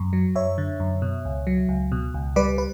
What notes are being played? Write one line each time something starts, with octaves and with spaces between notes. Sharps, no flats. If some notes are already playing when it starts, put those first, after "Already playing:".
Already playing: F#2
F#3
F#2 C#5 E5
D3
F#2
B2
C#2
F#3
C#2
B2
C#2
G3 B4 D5
B4